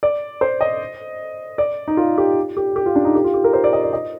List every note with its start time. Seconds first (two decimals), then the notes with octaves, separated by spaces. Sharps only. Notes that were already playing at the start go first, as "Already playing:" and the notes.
0.03 D5
0.41 C5
0.61 D#5
1.58 D5
1.88 D#4
1.97 F4
2.18 G4
2.57 G4
2.76 G4
2.86 F4
2.96 D4
3.05 D#4
3.15 G4
3.24 F4
3.34 G4
3.44 A#4
3.53 C5
3.64 D5
3.73 D#5
3.83 D5
3.93 D#5